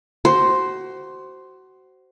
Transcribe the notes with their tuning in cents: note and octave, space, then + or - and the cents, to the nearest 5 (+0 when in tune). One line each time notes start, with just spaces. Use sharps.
F#4 +25 C5 +0